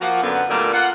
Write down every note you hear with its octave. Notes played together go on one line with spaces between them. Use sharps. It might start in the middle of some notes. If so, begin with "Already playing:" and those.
F3 A#3 F4 F#4
F#2 D3 B3
A#2 D3 G3 A3 A#3
F4 F5 F#5